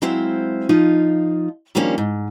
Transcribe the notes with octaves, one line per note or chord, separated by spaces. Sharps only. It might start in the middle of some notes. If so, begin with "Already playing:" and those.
F#3 G#3 C4 E4 C5 F5
F3 D#4 F4
D#3 F3 G3 A#3 C#4 D4
G#2